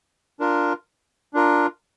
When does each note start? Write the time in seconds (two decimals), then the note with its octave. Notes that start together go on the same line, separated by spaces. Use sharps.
0.40 D4 F4 A#4
1.34 D4 F4 A#4